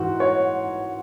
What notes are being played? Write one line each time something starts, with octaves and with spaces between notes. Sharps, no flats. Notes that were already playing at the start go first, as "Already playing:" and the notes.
Already playing: G#2 E3 F#4
C#5